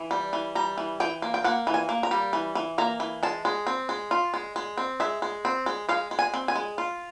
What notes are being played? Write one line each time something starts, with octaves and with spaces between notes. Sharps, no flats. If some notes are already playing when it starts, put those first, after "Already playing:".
Already playing: E3
G3
E3
G3 A#5
E3
E3 G5
A#3
G5
A#3 F#5
E3
G#5
A#3
A#5
G3
E3
E3
A#3 A#5
E3
G#3 A5
G#3
C4
G#3
F4
G#3
G#3
C4
G#3 E5
G#3
C4
G#3
G#3 F5
G#3
G#5
C4
G#5
G#3
F4